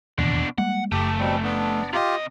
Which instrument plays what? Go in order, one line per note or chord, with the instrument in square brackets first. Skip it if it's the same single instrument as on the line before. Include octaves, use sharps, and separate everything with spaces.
[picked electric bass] E1 A1 D#2 [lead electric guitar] B2 D4
[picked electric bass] G3 G#3 A#3 [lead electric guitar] F#5
[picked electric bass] F#1 [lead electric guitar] F3 A3 [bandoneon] G4
[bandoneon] B2 G3 C4
B3 D4
[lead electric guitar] C3 D#5 [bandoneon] F4 G4